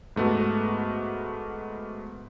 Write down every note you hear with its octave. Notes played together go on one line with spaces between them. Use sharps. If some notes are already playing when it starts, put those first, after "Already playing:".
G#2 A3 B3 F#4